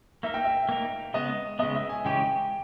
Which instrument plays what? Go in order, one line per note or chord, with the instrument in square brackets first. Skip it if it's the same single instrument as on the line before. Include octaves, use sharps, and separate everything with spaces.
[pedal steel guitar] A#3 D#4 A#4 [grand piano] E5
[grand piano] G5
E5
[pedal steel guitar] A#3 D#4 A#4
[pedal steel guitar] C#3 G#3 B3 [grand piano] D#5
[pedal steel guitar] C#3 G#3 B3 [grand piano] D#5
[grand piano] E5
G#5
[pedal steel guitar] C#3 E3 G#3 C#4 G4 [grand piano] G5